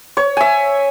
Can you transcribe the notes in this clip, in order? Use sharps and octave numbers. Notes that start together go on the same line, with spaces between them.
C#5
E5 G#5